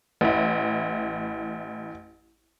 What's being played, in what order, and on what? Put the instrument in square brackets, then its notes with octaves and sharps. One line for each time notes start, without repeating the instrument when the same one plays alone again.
[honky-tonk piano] A1 E4